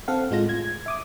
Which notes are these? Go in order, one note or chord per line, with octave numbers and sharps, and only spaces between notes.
C4 A4 F5 F#5
A2 G#3 F4 A#6
G#6
E5 D6 D#6